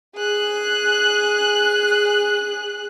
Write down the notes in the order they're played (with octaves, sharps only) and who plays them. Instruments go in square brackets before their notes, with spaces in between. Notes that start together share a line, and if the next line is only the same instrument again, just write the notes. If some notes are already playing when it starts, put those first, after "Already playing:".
[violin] G#4 F#6